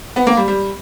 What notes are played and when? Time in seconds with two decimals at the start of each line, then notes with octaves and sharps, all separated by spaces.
0.16 B3
0.27 A#3
0.37 G3
0.48 G3